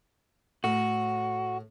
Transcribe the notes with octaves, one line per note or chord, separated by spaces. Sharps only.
A2 F#4